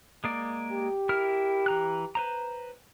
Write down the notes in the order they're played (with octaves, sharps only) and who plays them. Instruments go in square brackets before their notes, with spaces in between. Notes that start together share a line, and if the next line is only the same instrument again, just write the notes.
[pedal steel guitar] G#3 A#3 D5
[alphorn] G4
[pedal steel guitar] E4 A#4 F6
E3 A#5 F#6
B4 C5 A#5